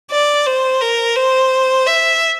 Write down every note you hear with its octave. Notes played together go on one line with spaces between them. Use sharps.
D5
C5
A#4
C5
E5